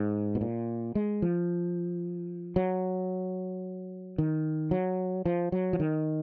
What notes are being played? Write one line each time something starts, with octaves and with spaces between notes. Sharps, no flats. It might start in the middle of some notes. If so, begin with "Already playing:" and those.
Already playing: G#2
B2
A#2
G#3
F3
F#3
D#3
F#3
F3
F#3
F3
D#3